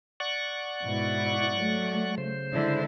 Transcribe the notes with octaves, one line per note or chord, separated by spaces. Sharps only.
D5 F#5 C#6
G#2 B2 E4
F#3 A3
C#3 C5
D3 G#3 E4